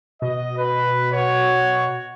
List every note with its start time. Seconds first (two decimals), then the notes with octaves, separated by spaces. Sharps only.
0.22 B2 D#5
0.57 B4
1.13 F#4 C#5